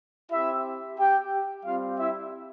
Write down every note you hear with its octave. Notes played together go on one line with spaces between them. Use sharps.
C4 E4 G4 E5
G4 G5
G3 C4 F4 G4 F5
E4 E5